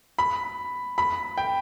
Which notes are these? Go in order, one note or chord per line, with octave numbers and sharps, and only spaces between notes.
B5
B5
G5